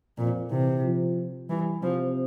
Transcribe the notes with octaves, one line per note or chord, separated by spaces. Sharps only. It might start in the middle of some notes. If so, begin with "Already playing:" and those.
F2 A#2
C3 E3
F3
E3 G3
C3 F3